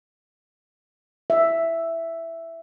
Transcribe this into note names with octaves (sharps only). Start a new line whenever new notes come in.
E5